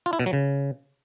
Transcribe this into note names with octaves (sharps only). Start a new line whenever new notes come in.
F4
E4
B2
F#3
C#3